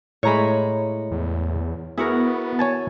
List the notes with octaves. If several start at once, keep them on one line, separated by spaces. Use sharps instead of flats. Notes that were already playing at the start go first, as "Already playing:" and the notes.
A2 G#3 C#5 A#5 B5
E2
B3 E4 F#4 G#4 A#4
C#5 G#5 A5